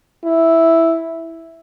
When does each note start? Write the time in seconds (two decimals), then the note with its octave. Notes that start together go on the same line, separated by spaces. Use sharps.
0.25 E4